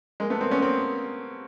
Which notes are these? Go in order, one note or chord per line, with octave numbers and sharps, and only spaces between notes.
G#3 A#3
A3 B3
A#3 C4
B3 C#4
A#3 C4